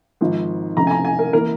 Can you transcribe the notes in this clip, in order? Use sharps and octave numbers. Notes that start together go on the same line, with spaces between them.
G#1 G#2 F3
F1 F2 C#3 A#5
G#5
A#5
G#5
A#4
E3 A#3 A#4